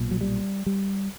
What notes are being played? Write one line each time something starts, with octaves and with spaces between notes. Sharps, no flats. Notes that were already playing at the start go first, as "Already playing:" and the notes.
Already playing: B1 A#2
F#3
G3
G3